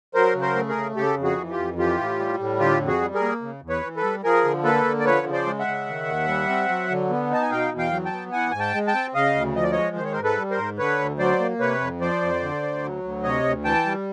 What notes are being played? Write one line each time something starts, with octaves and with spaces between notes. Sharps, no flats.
F#3 A#4 C5
C#3
A#4 C5
A3
G#4 A#4
C#3
C#3 G4 A4
F2
F#4 G#4
E3
F4 G4
F2
E3 F4 G4
A2
G3
A2
D3 F4 G4
F2
F#4 G#4
G3
G#4 A#4
A#3
C#3
E2
B4 C#5
E3
A4 B4
G3
F3 G#4 A#4
D3
A#3 A4 B4
D3
D5
F3 B4 C#5
C#3
C5 D5
G#3
E5 F#5
C#3
D#3
D#2
G3
C4
F#3
D3
B3
D#4 A5
G#5
B2 F5 G5
E2
F5 G5
F#3
G5 A5
B3
E3 F#5 G#5
G#2 G#5
G5 A5
G#3
G5 A5
C4
C#3 D#5 F5
D2
F3 D#5
D5
G#3 C#5 D#5
D#3 C5
C#5
A#4 C5
G#2
A4 B4
G3
A#4 C5
G#2
D3 B4 C#5
D2
F#3 C5 D5
A#3
C3 B4 C#5
F2
F3 C5 D5
F2
D3
D2
F#3
D2
C3 C#5 D#5
D2
E3 G5 A5
G3